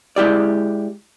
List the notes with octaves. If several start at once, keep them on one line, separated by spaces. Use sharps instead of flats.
G#3 E4 G4 D5